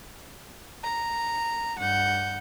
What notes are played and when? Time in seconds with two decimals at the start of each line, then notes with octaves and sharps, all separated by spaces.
0.84 A#5
1.77 G2 F#5 G6